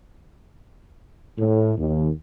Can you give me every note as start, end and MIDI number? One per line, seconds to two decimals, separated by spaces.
1.38 1.73 45
1.77 2.09 39